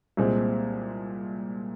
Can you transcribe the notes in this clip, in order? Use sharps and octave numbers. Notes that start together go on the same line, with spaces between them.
C2 A#2 G#3 C4